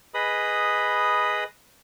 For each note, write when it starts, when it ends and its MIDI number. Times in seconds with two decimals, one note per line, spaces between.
0.14 1.44 68
0.14 1.44 71
0.14 1.44 75
0.14 1.44 83
0.14 1.44 87